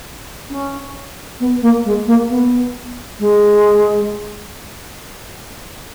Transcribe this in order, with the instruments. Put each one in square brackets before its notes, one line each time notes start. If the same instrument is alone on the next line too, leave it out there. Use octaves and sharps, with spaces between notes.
[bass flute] C#4
B3
A#3
G#3
A#3
B3
G#3